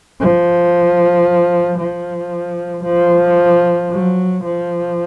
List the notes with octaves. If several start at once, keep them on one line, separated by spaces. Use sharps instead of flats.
F3
F3
F3
F#3
F3